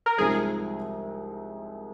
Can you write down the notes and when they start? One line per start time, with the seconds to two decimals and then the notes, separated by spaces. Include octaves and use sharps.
0.06 A#4
0.18 C2 C3 F3 G#3 D#4 G#4